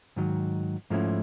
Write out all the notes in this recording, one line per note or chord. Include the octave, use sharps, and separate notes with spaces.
G#2 D#3 F#3
G#2 F3 A3 C#4 E4